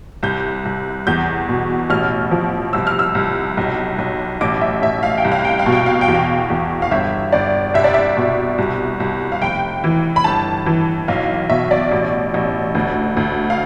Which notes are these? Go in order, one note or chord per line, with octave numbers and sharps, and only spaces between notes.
C2 G6
C2
E2 G6
B2
A1 F6
F3
C2 E6
F6
E6
C2
B1
B1
A1 D6
E5
A1 E5
F5
G5
C2
F5
G5
F5
B2
G5
F5
G5
E2
F5
E2
F5
G1 E5
G1 D5
C2 E5
D5
E5
B2
C2
C2
F5
F1 G5
E3
B5
G1 A5
E3
B1 F5
B2 E5
D5
A1
A1
D2
D2
F5